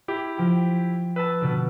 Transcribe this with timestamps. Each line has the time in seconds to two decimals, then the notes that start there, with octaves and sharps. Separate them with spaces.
0.08 E4 G4
0.37 F3 G5
1.16 B4 A5 E6
1.41 B2 D3